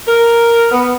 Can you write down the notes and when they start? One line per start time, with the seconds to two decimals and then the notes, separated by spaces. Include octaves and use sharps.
0.08 A#4
0.72 B3